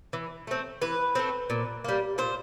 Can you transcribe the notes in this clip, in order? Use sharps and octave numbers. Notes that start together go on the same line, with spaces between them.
E3
A3 C4
E3 B4
A3 C4
A#2
G3 A#3
A#2 C5